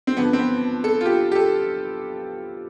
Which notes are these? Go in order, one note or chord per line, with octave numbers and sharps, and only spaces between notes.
C4
G2 D3 F3 B3
C4
B3
A4
F4
G4
G4
A4